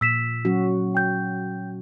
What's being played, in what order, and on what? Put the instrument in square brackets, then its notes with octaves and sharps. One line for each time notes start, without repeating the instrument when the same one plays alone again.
[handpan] A#2 [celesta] E6 B6 E7
[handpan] F#3 C#4 F#4
[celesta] G5 G6